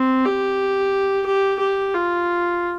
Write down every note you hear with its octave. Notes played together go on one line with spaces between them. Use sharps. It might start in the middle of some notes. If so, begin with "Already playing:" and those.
Already playing: C4
G4
G4
G4
F4